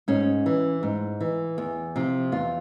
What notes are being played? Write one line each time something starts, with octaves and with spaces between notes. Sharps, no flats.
G#2 C#4
E3
G#2
E3
E2
C3 F3
E2 F4